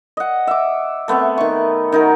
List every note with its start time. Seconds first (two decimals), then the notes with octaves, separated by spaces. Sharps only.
0.17 D#5 F#5
0.47 E5 D6
1.08 A3 B3 C4 E5
1.38 D#3 C#6
1.92 D#3 D#4 F#4 A#4